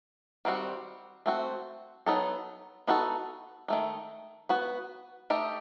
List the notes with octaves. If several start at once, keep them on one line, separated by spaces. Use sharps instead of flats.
D#3 G3 C4 F#4
A3 C4 F#4
F#3 B3 D#4 A4
B3 D#4 F#4 A4
D#3 A3 D#4
B3 F#4 B4
A3 D#4 G4 D#5